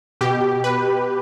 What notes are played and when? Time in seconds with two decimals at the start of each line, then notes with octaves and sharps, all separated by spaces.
0.21 B2 G4
0.64 B4